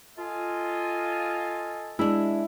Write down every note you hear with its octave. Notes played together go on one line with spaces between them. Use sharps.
F4 A4 D#5 G#5
G#3 D4 E4